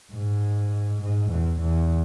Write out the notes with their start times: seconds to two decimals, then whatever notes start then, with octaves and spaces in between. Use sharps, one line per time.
0.13 G#2
1.02 G#2
1.32 E2
1.61 E2